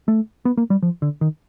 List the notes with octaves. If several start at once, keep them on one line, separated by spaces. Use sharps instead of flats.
A3
B3
A#3
G3
F3
D3
D#3